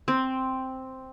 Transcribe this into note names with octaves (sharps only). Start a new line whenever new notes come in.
C4